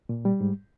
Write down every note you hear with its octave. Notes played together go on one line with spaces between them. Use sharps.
A#2
G3
G#2